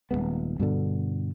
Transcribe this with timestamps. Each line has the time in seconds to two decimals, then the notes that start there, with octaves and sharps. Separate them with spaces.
0.11 D#1 F#2 G#3 B3
0.59 G2 B2 D3